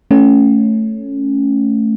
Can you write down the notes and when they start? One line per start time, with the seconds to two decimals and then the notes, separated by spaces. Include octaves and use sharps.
0.11 A3 C#4